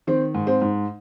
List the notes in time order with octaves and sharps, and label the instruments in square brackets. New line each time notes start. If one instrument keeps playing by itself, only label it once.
[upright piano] D#3 C4
G#2
C4
G#2